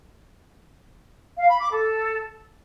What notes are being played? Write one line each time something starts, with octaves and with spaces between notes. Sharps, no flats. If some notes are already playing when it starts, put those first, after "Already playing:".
F5
B5
D6
A4